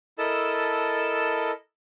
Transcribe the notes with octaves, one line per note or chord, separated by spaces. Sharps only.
E4 A4 A#4 D#5 A5 E6